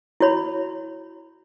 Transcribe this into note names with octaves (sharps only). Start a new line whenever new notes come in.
E4 F#4 C#5 B5